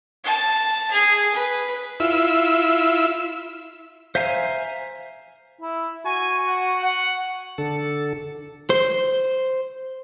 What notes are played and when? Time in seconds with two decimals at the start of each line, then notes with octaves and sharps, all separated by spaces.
0.24 A5
0.91 G#4
1.34 B4
2.00 E4 F4 E5
4.15 C5 E5 F5 G#5 A#5
5.61 E4
6.06 F#4 G#5
6.47 F#5
6.83 F#5
7.58 D3 A4
8.70 C5